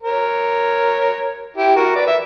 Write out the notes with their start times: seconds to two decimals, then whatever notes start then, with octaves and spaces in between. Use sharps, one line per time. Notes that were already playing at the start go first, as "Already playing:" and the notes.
0.03 A#4 C#5
1.57 E4 G4
1.76 F#4 A#4
1.96 B4 D5
2.07 E5